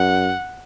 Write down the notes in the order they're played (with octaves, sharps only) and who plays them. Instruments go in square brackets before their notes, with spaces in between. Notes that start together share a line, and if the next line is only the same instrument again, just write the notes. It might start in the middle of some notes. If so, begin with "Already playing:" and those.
Already playing: [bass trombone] F#2 [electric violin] F#5